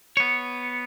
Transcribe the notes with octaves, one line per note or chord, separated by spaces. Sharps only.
B3 C#5